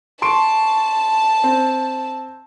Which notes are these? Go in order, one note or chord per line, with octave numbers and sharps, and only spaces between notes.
A5 C6 C#6 D7
C4